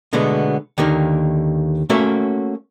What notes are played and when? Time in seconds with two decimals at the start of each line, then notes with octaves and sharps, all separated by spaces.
0.13 B2 D3 G#3 A3 B3
0.78 D#2 D3 D#3 A#3
1.90 A3 A#3 C#4 F#4 A#4 E5